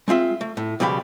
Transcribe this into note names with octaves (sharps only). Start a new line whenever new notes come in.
G#3 C4 F4 E5
A3
A2
C#2 B2 F3 G3 G5 B5